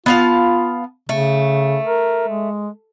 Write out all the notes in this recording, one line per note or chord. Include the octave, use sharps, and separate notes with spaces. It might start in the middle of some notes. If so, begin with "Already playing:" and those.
B3 F4 F5 A5
C#3 A3
A#4
G#3